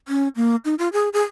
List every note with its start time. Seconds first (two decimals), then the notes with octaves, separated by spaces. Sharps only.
0.08 C#4
0.36 A#3
0.65 D#4
0.79 F4
0.93 G#4
1.13 G#4